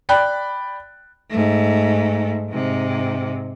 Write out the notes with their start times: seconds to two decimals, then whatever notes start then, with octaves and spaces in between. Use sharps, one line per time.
0.09 D5 G5 B5 F#6
1.30 G#2 A3
2.49 G#2 C3